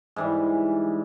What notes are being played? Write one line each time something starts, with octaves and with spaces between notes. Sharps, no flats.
G#2 E3 G3